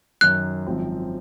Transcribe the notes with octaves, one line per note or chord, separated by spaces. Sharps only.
F#2 D#3 F#3 F#6
G#1 F#2 F3 C4